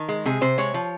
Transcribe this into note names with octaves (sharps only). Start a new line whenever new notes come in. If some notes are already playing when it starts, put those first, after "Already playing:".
Already playing: D#3
G#3
C3 G#4
C3 C5
G#3 C#5
F3